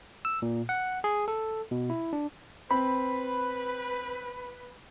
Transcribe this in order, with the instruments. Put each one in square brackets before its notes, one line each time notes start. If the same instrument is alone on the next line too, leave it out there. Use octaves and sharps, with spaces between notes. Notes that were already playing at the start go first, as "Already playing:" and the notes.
[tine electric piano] E6
A#2
F#5
G#4
A4
B2
E4
D4
[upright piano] C4 [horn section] B4 [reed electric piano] B5